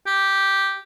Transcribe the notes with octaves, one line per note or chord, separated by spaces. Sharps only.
G4